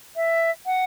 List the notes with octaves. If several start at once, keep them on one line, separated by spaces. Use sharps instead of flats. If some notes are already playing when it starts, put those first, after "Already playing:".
E5
F#5